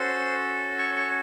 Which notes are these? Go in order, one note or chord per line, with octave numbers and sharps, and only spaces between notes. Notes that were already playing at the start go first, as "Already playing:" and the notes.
Already playing: C#4 F#4 A4 C5 C6
C#5 C#6
C#5 C#6